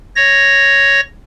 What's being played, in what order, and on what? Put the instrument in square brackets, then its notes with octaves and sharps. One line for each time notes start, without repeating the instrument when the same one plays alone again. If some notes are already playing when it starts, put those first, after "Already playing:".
[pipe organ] C#5 A#6